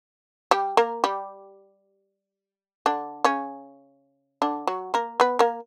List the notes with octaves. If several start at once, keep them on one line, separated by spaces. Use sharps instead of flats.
G3 G4
A#3 A#4
G3 G4
D3 D4
C#3 C#4
D3 D4
F#3 F#4
A#3 A#4
B3 B4
A#3 A#4